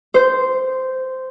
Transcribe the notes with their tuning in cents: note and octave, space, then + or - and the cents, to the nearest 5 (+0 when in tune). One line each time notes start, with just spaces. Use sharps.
C5 -10